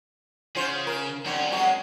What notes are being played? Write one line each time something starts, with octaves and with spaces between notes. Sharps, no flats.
C#3 C#4 F4 C5
A#4
G2 C3 F#3 C#4
F#3 G#3 F#4